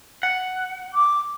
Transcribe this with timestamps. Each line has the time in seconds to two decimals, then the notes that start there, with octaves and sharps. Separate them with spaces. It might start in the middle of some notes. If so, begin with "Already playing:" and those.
0.23 F#5
0.94 D6